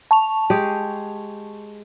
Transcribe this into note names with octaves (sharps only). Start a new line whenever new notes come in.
A5 C#6 F7
G#3 G4 G#4